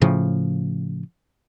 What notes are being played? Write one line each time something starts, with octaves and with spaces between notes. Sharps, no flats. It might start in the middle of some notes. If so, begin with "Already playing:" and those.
A2 C#3 F3